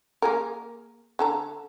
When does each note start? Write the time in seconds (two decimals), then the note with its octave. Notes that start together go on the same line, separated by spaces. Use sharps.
0.22 A#3 G#4 A#4
1.19 D3 A4 A#5